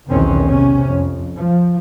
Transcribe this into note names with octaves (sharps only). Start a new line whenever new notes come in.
B1 E2 B2 D#3 C4 C#4
C3 C#4
F2
F3